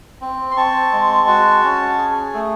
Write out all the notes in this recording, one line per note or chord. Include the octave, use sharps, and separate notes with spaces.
C4
C6
C4 A5 C#6
G#3
F#4
C#4
G#4
A3